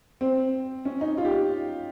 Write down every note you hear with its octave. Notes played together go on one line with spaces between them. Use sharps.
C4
C#4
D#4
F4
G4